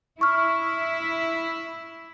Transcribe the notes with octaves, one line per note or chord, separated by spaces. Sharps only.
E4 C#6 F6